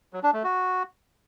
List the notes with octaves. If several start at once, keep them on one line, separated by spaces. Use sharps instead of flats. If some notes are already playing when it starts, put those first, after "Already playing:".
F#3
D4
A3
F#4